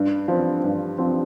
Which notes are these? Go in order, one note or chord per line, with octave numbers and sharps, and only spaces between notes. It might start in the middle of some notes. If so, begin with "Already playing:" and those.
Already playing: G2
F3 C4
G2
F3 C4